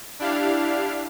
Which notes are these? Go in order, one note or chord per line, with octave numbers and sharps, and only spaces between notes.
D4 E4 G4 F5